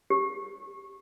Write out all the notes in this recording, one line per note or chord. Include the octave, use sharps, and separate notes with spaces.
G4